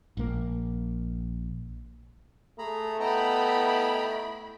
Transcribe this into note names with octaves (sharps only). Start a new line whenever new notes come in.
A#1 A#3
A3 G#4 A#5 B5
B3 E4 D#5 G5 A#5 B5